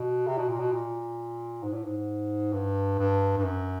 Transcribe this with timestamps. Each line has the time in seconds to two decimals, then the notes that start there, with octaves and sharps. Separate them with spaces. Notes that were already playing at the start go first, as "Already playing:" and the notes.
Already playing: B2
0.27 C3
0.38 B2
0.49 A#2
0.60 B2
0.73 A#2
1.63 G#2
1.73 A2
1.84 G#2
2.53 G2
2.99 G2
3.37 G2
3.44 F#2